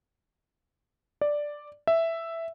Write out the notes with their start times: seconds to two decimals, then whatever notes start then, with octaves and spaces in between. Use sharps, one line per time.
1.21 D5
1.87 E5